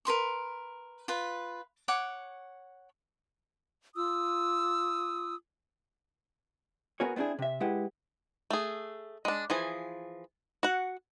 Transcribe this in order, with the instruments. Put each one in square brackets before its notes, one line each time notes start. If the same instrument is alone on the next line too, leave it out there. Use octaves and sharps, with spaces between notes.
[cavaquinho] A#4 B4 C6 C#6
F4 B4
C#5 F#5 D6
[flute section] F4 D#6 E6
[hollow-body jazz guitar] B3 F#4 G#4 A#4 C#5
B3 C4 D4 E4 G#4
C3 E5
G#3 E4 G4 B4 F#5
[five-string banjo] A3 G#4
G#3 D4
E3 F3 G#4
F#4 F#5